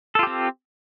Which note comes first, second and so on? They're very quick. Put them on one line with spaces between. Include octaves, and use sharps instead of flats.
A4 F4 G4 C4